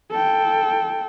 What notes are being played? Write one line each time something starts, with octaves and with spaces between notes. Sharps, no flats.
A4 G5